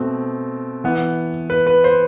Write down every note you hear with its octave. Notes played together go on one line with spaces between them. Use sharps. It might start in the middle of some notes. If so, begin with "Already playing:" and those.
Already playing: B2 A3 C4
E3 B3
B4
B4
C5